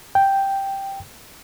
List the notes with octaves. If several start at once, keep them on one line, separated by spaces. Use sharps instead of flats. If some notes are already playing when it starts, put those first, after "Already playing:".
G5